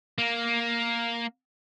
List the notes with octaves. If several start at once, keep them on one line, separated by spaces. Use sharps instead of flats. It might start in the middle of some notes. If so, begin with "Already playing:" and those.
A#3